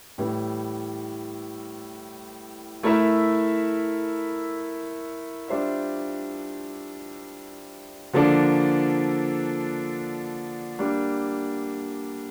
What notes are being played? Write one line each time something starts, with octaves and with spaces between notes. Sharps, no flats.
A2 E3 G3
A3 E4 A#4 E5
G3 D4 F4 C5 E5
D3 F3 A#3 D4 A4
G3 A#3 D4